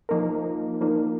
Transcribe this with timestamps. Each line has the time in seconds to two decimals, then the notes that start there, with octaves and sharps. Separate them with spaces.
0.09 F3 A#3 D#4 A#4
0.81 F3 A#3 D#4 A#4